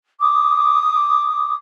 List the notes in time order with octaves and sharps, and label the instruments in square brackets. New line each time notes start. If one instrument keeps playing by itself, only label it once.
[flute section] D6 D#6